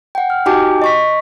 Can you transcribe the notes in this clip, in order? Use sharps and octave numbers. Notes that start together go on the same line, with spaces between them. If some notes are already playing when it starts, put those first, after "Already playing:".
F#5 G5
F6
D#4 F#4 G4 G5 G#5 D6
D#5 C#6 B6